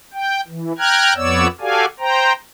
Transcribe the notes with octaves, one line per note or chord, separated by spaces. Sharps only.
G5
E3
G5 A#5 F6 F#6 G#6
F2 B3 C#5 D5 E6
F#4 G4 A4 D5 F5 G#5
C5 G5 A#5